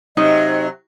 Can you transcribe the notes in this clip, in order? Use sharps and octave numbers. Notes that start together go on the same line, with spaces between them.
C3 F#3 D#4 D#5